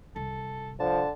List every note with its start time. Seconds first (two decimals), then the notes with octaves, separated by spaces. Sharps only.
0.16 C2 A4
0.80 D3 F3 A5